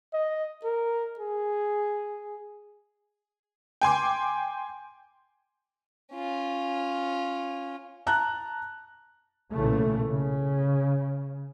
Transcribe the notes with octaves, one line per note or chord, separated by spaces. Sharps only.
D#5
A#4
G#4
G5 G#5 C6 D6
C#4 F4
A5 A#5 F#6
B1 A#2 C#3 E3 A3
C#3